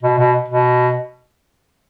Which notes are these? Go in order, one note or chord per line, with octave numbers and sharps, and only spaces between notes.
B2
B2
B2